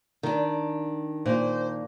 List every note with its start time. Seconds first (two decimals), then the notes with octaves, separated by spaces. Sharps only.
0.23 D#3 D4
1.26 A#2 C5